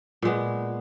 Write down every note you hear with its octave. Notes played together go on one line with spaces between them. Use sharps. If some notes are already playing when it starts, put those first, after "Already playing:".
A#2 G#3 B3